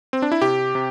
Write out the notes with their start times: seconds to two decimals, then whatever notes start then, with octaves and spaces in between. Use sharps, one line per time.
0.13 C4
0.22 D4
0.32 E4
0.42 C3 G4
0.75 C3